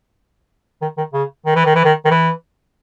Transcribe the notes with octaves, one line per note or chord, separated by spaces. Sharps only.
D#3
D#3
C#3
D#3
E3
D#3
E3
D#3
D#3
E3